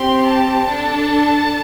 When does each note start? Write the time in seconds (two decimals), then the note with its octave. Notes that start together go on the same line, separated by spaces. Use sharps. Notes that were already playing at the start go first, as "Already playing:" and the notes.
Already playing: C4 G4 C6
0.25 A5
0.66 D4 A4